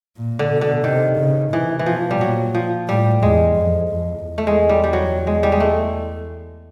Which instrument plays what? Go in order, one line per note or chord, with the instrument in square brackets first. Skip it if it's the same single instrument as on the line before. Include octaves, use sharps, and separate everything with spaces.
[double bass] A#2
[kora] D3
[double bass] B2
[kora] D3
[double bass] C3 [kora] D#3
[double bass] C#3
[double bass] C3 [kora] E3
[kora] E3
[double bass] B2 [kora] F3
[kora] G3
[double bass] A#2 [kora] F#3
[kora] F3
[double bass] A2 [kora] G3
[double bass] E2 [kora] G#3
[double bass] F2
F2
E2
[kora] A3
G#3
G3
G3
F#3
G#3
G3
G#3
A3